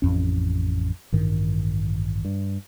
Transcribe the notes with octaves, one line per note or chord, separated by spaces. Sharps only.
A1 F2 C#4
A1 G2 D#3
G2